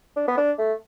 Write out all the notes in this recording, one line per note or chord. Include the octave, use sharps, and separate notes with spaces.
D4
B3
D4
A3